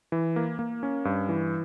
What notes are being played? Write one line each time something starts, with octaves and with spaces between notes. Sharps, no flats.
E3
A#3
A#3
C#4
G2
E3